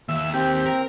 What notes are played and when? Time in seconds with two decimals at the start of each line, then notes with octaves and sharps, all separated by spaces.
0.09 D#2 E5
0.34 C4 G4
0.65 A#4